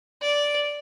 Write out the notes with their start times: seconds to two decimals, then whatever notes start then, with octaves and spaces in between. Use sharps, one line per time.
0.22 D5